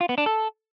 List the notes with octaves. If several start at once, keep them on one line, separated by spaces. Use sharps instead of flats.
F4
B3
D4
A4